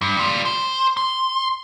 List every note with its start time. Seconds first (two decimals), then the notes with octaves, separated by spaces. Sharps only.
0.01 G2
0.17 G3 F4
0.45 C5
0.97 C6